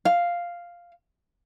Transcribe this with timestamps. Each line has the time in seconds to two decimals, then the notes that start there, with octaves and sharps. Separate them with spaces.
0.05 F5